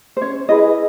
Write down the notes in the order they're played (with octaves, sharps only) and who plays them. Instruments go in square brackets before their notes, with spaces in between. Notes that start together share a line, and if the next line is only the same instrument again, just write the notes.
[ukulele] C5
C#4 C#5
E4 G#4 B4 D#5